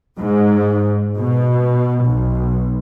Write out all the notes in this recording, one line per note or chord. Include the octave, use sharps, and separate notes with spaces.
G#2
B2
B1